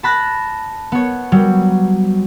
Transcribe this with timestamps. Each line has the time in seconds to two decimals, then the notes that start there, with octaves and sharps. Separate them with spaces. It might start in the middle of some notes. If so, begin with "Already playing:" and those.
0.03 A5 B5 F#6 A#6
0.92 B3 C#5
1.32 F#3 G3